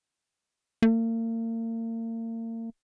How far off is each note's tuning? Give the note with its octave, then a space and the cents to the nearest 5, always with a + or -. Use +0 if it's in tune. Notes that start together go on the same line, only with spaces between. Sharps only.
A#3 -40